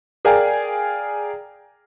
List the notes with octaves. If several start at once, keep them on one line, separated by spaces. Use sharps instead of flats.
G#4 A#4 D5 F5 G5 G#5